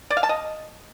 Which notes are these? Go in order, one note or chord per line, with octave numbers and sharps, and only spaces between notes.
D5
F5
A5
D#5